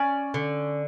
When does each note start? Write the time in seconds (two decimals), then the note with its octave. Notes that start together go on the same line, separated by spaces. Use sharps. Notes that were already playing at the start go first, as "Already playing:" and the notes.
Already playing: C#4 D5
0.34 D3